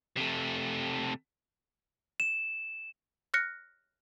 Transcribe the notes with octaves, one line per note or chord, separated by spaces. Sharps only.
C3 A3
E7
F6 F#6 A#6 C#7